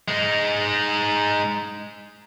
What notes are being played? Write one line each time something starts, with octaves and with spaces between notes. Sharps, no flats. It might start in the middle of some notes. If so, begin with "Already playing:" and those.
G#3 D#4